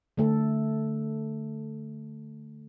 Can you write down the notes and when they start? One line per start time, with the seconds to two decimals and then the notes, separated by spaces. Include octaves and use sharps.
0.17 D3 A3 A4